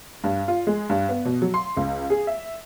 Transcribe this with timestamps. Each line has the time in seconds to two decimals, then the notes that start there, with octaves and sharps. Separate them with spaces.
0.24 G2
0.48 F4
0.67 G#3
0.90 G2
1.09 B3
1.25 B2
1.42 F#3
1.54 C6
1.77 C#2
2.10 G#4
2.27 E5